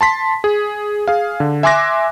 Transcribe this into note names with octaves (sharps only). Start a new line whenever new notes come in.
A5 C6 B6
G#4
G#4 F5
D3
E5 G#5 C6 D6 F#6 A#6